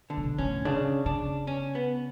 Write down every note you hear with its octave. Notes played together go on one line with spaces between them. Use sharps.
D3
A2
B2
B2 C#4
A2
C#3 D4
C#3 D4
C#4
B3